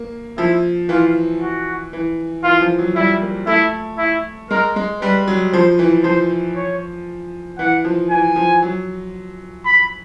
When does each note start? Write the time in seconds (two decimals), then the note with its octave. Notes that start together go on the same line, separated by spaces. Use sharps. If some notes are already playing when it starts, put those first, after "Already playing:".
Already playing: A#3
0.38 F3 E4
0.89 E3 F4
1.41 F#4
1.93 E3
2.44 E3 F4
2.61 F3
2.79 F#3
2.96 G3 E4
3.21 A#3
3.47 A3 E4
3.98 E4
4.50 G#3 A#4
4.76 G#3
5.01 G3 B4
5.28 F#3
5.53 F3 C5
5.79 E3
6.04 F3 C5
6.56 C#5
7.59 E3 F#5
7.85 F3
8.11 E3 G#5
8.36 F3
8.62 F#3
9.66 B5